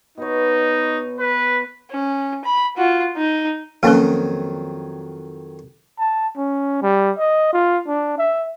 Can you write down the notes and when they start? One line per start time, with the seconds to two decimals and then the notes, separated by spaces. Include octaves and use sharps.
0.18 B2 B3 D#4 C#5
1.19 B4
1.91 C#4
2.45 B5
2.77 F4 F#4
3.16 D#4
3.83 F2 D#3 F#3 A#3 C#4 B4
5.99 A5
6.37 C#4
6.83 G3
7.18 D#5
7.53 F4
7.87 D4
8.18 E5